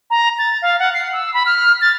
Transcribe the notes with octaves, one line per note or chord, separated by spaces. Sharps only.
A#5
A6
F5
F#5
C7
E6
B5
F6
A6